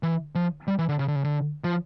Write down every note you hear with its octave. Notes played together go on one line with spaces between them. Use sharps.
E3
F3
G3
E3
D3
C#3
D3
C#3
D3
F3